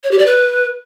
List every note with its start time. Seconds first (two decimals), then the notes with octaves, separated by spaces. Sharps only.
0.04 C#5
0.11 G4
0.19 D5
0.26 B4